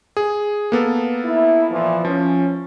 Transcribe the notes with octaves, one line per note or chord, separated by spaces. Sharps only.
G#4
A#3 B3 A4
E4
A#2 E3 F3
F3 C#4